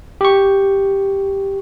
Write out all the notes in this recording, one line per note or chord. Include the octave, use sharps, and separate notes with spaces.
G4 C#6